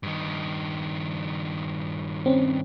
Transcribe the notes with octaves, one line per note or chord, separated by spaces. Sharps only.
G2 D#3
C4 C#4